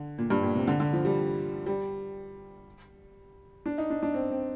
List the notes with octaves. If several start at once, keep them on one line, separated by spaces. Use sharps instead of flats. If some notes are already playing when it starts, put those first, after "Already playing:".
Already playing: D3
A#2
G2
A#2
C3
D3
D3
F3
G3
G3
D4
D#4
D4
D4
C4
C4